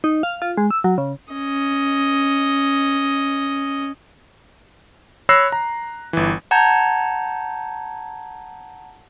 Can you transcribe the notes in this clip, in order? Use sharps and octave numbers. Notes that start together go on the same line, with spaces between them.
D#4
F5
F4
G#3
E6
F#3
C#3
C#4 D#5
C#5 B5 E6 F#6 A#6 C7
A#5
G1 E3
F#5 A5 A#5 G6 G#6